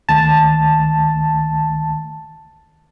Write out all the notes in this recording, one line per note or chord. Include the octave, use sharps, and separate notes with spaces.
C#2 D#3 A3 A5